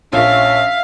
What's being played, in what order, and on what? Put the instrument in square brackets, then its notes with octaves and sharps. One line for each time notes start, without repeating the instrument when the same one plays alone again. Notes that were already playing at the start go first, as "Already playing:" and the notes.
[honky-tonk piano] A#1 F3 [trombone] C#4 [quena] E5 [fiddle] F5